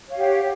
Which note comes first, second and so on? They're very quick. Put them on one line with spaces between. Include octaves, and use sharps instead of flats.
C#5 F5 G4 F#5